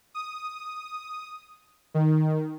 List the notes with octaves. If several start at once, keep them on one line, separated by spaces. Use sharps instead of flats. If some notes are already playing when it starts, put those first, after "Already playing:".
D#6
D#3